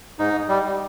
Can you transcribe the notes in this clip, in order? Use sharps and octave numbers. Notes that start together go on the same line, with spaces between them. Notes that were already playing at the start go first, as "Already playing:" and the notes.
G#2 D#4
G3